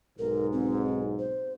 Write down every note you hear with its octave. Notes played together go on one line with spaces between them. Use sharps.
B1 G#2 A#4
C4
C5